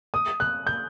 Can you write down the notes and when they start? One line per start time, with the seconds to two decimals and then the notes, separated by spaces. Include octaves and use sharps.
0.14 D#6
0.40 F#6
0.67 G6